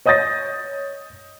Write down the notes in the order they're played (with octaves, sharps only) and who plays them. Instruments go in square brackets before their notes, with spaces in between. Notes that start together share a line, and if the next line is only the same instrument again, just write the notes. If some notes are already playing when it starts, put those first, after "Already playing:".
[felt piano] C#5 D#5 D#6 G6 A6 A#6